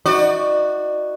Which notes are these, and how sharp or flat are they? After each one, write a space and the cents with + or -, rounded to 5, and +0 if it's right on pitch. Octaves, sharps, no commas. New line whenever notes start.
D#4 +40 F#4 +0 D5 +30